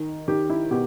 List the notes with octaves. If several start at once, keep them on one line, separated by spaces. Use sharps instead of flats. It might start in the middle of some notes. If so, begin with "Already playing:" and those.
Already playing: D#3
D#3 G4
E4
B2 G4